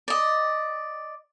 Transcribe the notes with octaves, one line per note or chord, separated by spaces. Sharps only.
D5 D#5